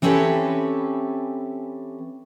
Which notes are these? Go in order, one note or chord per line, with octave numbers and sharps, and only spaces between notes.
E3 C4 C#4 G4 A4 B4